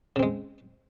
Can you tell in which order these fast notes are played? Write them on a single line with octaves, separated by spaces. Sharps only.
C#3 C4 G#3